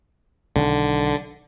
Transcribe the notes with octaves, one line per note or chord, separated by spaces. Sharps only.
B1 D3 D#3